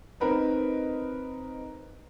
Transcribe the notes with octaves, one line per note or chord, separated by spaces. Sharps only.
C4 D#4 A#4 B4 D#5